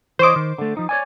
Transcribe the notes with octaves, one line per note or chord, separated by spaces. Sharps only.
E3 C5 C#5 D#5 D6
D#3
D3 A3
F3 D#4
C#5 D5 G#5